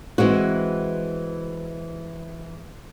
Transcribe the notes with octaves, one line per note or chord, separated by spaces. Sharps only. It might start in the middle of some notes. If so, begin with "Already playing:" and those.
E3 G#3 C4 F#4